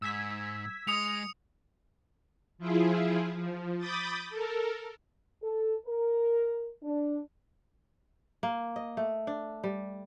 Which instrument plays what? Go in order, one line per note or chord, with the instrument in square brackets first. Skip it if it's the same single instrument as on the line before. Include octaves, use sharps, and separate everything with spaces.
[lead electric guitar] G#2 [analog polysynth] E6 G#6 B6
[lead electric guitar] G#3 [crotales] D#6 C#7 F7
[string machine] F3 E4 F4 G#4
F3
B5 D6 D#6 G6 A6
A4 A#4
[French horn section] A4
A#4
D4
[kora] A#3
D#5
A3
D4
G3